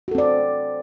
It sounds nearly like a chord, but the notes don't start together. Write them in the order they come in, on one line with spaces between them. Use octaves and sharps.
F#4 A4 C4 D5